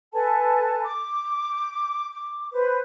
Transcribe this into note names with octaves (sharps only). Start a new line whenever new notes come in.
A4 B4 G#5 A5
D6
D6
B4 C5